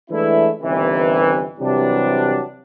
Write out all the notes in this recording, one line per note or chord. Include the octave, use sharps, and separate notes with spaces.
E3 G#3 A3 D4 E4
G1 C3 D#3 E3
C3 E3 F#3 G3 D4